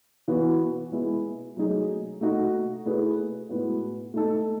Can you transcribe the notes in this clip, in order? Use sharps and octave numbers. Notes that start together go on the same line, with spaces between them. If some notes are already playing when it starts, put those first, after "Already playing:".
E3 B3 F#4
G#3 B3 E4
F#3 A3 D#4 G#4
A3 D#4 F#4
A3 E4 G#4 B4
A2 G#3 B3 F#4
A3 D#4 A4